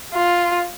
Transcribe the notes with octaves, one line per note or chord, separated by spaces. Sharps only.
F4